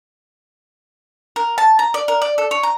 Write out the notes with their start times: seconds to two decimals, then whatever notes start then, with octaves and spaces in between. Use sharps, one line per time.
1.36 A#4
1.58 A5
1.79 A#5
1.94 D5
2.08 A#4
2.22 D5
2.38 A4
2.51 C#5
2.63 A#5